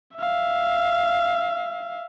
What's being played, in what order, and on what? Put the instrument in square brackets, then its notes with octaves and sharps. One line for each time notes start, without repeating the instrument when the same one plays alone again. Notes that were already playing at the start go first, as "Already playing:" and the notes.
[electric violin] E5 F5